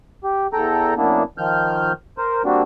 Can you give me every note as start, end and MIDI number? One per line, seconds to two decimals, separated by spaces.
0.24 0.47 67
0.53 0.94 40
0.53 0.94 69
0.53 0.94 79
0.53 0.94 82
0.97 1.23 42
0.97 1.23 58
0.97 1.23 59
0.97 1.23 62
0.97 1.23 64
1.38 1.92 51
1.38 1.92 53
1.38 1.92 89
1.38 1.92 91
2.18 2.42 70
2.18 2.42 72
2.45 2.62 55
2.45 2.62 58
2.45 2.62 60
2.45 2.62 62
2.45 2.62 66